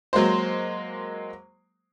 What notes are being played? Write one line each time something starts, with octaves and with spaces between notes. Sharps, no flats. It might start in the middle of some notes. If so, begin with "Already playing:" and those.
F#3 G#3 A#3 C5